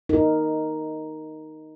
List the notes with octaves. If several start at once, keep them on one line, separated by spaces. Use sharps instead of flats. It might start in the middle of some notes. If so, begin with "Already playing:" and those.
D#4 A#4